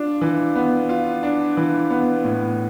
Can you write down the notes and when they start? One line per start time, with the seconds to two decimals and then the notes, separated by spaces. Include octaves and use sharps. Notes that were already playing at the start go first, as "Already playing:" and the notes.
Already playing: D4 F4
0.21 E3
0.55 B3
0.89 F4
1.23 D4
1.57 E3
1.90 B3
2.25 A2